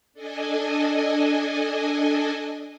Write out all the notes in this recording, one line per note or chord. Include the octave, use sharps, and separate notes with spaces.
D4 A4 D#5 G#5